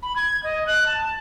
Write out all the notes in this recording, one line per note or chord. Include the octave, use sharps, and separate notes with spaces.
B5
G#6
D#5
F#6
A5